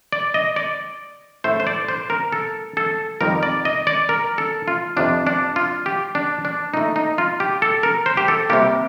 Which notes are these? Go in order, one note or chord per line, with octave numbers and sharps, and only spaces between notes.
D5
D#5
D5
A2 A3 C5
C5
D5
C5
A#4
A4
A4
F2 D#3 G3 A#4
D5
D#5
D5
A#4
A4
F4
F2 C3 F3 D4
D4
F4
G4
D4
D4
A#2 A3 D#4
D#4
F4
G4
A4
A#4
C5
G4
A4
C3 G3 A#3 G4